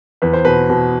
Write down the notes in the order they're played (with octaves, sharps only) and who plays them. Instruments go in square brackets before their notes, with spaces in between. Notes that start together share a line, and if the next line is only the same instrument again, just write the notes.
[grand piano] E2 B4
C5
B2 B4
B2